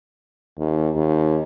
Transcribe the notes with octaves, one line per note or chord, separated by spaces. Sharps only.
D#2
D#2